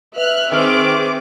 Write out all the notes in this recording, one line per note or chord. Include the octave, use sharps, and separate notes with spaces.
B4 E5 F6 F#6
D#3 G#3 C4 B4 D6 F6